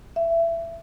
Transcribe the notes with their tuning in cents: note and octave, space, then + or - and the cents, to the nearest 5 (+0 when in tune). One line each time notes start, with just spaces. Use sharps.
E5 +20